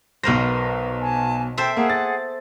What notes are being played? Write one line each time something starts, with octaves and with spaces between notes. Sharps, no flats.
B1 B2 A#4 C5 A#6
G#5 A5
A4 C5 E5 G5
A#3 G#4 F#5
A6